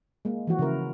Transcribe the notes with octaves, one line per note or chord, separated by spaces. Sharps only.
G#3 A#3
E3 F3 F#4
C#3 E4 A#4